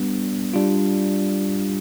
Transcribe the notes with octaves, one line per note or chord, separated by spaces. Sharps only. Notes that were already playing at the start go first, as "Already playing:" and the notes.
Already playing: G3 B3 D4
G3 D4 F4